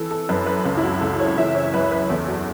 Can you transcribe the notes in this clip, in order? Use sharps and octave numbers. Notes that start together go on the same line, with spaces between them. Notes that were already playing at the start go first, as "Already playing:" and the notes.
Already playing: E3 A4
A4
F#2 B4
B4
C#2 A4
E4
F#4
C#2 A4
C#5
E3 E5
C#5
F#2 B4
B4
E2 A4
F#4